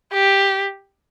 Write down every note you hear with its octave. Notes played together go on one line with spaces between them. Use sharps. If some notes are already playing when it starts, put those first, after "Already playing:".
G4